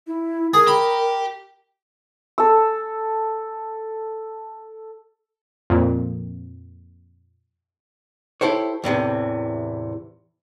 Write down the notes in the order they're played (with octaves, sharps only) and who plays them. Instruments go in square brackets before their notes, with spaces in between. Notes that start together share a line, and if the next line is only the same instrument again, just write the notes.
[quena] E4
[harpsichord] G#4 [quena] A#4
[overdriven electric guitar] G4 [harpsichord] B5
[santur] A4 E6
[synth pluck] F2 A#2
[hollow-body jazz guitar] E4 G4 A4 C5 C#5
E2 A2 C3 E3